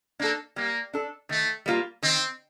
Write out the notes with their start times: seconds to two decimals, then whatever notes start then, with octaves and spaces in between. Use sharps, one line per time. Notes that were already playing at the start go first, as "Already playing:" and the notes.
0.20 A#3 D4 A4
0.56 G3 A#3
0.94 D4 A4
1.29 D#3 A3
1.66 G3 A#3 F4
2.03 D#3 C4